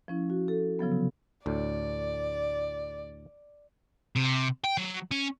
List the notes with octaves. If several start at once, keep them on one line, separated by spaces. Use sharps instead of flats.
F3 C#4 E4
F#4
A4
C#3 F3 F#3 B3
C3
D2 A2 D5
C3
G5
F#3
C#4